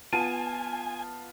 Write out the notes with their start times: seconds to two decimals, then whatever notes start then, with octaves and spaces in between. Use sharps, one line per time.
0.13 B3 F4 G#5 A5